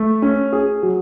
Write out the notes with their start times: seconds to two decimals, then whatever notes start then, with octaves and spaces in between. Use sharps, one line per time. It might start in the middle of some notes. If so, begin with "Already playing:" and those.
Already playing: A3
0.22 C#4
0.53 G#4
0.83 F#3